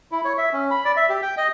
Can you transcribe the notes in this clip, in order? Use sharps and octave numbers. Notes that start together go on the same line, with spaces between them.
E4
C#5
E5
C#4
B5
D5
E5
G4
G5
D#5